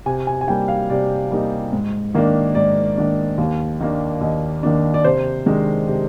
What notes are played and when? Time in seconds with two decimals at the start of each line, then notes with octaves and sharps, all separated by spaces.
0.06 C3 G#5
0.27 G#5
0.41 G#5
0.47 G3 A#3 D#4 G5
0.68 F5
0.90 C3 D5
1.31 G3 A#3 D#4
1.73 G#2
2.15 D#3 A#3 D4
2.55 G#2 D5
2.98 D#3 A#3 D4
3.38 D#2
3.81 D#3 A#3 D4
4.21 D#2 D#5
4.63 D#3 A#3 D4
4.94 D5
5.04 C3 C5
5.46 D#3 G#3 D4
5.87 C3